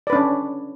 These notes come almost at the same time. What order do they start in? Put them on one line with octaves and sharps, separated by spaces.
D5 B4 D4 C#4